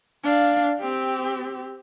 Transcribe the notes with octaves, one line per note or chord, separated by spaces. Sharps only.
D4 F5
C4 G4